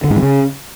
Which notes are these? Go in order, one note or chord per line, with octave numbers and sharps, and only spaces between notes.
D3
G#2
E3
C#3